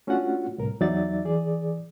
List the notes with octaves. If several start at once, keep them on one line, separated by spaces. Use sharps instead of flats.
A3 C#4 D4 F4 F#4 F#5
C2 A2 A#4
E2 F#3 D#4 D5 E5 A6
E3 G#4 D5